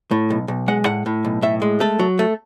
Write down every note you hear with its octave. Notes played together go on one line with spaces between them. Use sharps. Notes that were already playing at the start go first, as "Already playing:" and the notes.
A2
B1
B1
G#3 F#5
A2 F#5
A2
B1
A2 E5
G#3
A3 A4
F#3
A3